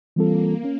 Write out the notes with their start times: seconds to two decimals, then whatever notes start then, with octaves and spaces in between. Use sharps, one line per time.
0.16 E3 G3 A#3 C4 F4 A4
0.63 A#3 C#4